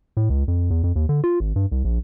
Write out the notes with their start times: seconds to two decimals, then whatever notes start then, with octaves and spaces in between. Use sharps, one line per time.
0.17 A2
0.30 C#2
0.48 F2
0.70 E2
0.84 F2
0.96 D#2
1.09 D3
1.24 F4
1.40 G#1
1.56 G2
1.72 C2
1.85 A#1